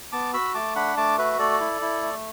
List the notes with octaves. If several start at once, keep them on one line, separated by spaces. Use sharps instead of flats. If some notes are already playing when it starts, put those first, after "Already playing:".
B3 A5 D6
F#4 B5 E6
A3 A5 D6
D4 F#5 B5
A3 A5 D6
F#4 B4 E5
A3 A4 D5
E4
E4
A3